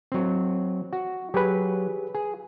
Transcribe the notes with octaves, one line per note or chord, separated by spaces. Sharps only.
F#3 C4
F#4
F#3 G4 G#4 B4
G#4